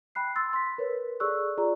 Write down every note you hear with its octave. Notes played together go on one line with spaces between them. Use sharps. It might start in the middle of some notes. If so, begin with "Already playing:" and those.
G5 B5 F#6 C7
C6 E6 A6
C6 B6
A#4 B4 C#5
G#4 A4 D5 C#6 E6 F#6
F4 G#4 D5 A#5